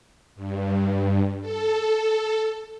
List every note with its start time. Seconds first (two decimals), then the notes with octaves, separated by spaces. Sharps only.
0.35 G2
1.41 A4